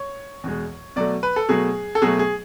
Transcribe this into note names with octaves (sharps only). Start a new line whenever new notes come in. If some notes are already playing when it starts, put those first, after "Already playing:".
Already playing: C#5
E2 B2 G#3
B2 F#3 A3 D5
B4
A4
B2 F#3 A3 G#4
A4
B2 F#3 A3 G#4
G#4